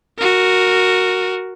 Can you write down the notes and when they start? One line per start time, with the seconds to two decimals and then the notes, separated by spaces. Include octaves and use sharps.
0.18 F#4 A#4